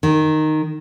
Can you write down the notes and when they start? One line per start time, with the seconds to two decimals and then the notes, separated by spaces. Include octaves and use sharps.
0.03 D#3